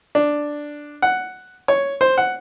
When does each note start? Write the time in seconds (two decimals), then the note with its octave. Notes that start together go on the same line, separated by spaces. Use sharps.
0.15 D4
1.02 F#5
1.68 C#5
2.01 C5
2.18 F#5